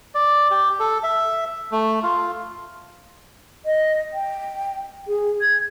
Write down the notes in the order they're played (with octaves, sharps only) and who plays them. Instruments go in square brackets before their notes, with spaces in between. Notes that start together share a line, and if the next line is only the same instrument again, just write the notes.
[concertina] D5
G4
A4
E5
A3
F4
[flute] D#5
G5
G#4
G#6